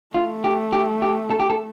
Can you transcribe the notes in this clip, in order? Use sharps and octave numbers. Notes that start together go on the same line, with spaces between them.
A3 F4
G4
G4
G4
A4
G4
A4